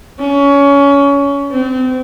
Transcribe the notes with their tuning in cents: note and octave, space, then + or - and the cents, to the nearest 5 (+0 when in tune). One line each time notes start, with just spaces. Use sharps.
C#4 +25
C4 -30